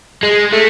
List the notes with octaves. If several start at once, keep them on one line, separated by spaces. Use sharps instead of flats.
G#3
A3